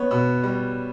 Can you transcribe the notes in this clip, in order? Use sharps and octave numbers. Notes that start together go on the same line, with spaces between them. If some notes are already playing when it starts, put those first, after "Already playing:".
Already playing: B3 C#5
B2
G3